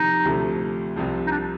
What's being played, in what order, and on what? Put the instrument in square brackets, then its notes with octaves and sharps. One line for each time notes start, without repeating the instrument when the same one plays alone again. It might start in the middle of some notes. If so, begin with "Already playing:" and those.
Already playing: [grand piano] F2 C3 D#3 G3 [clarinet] D#4
[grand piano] D2 C3 F3 A3
C2 C3 F3
[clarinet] D#4
D4